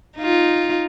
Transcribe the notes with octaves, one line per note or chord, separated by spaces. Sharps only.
D#4 F4